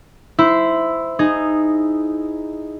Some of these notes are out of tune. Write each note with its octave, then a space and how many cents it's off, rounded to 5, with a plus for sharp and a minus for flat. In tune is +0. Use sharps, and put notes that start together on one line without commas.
E4 +0 C5 -15
D#4 -10 G#4 +0